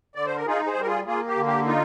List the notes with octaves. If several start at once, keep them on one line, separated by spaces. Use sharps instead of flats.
D3 D5
C5
A#4
D#4 F4 G#4
G#4 C5
G3
A#4
F4 G#4
A#3 F4 G#4
G4
D3
G4
D#4 F4